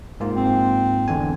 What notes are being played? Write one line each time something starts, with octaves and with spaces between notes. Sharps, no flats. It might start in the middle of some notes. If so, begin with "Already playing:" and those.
G#2 A#3 F4
C4
E2 D3 G#5